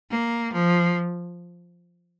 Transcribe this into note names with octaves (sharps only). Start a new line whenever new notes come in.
A#3
F3